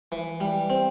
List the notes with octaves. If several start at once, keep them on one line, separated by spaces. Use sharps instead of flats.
E3
G3
C4